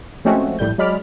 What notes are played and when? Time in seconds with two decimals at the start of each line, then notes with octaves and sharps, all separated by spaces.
0.25 F3 G#3 A3 C4 C#4 F#4
0.59 A#1 A2 G3 G6
0.78 F#3 G#3 D5 B5 F6